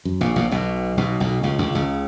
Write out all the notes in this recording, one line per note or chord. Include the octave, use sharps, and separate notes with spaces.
F#2
A#1 A#2
A#1 A#2
B1 B2
B1 B2
B1 B2
C#2 C#3
C#2 C#3
C#2 C#3